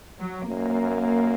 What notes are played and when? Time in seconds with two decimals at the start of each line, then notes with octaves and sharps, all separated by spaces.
0.18 F#3
0.49 F#2 A#3